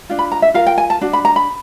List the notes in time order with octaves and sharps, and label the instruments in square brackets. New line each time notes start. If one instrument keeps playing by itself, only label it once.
[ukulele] D4 F4
B5
A#5
E5
F4 A#4 F5
G5
G#5
A5
D4 F#4
B5
A#5
B5